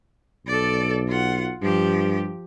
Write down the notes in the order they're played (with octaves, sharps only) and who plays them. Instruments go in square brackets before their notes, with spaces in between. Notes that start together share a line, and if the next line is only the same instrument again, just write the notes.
[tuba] B1 [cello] A4 D5
[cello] F4 F#5
[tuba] G2 [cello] F3 G4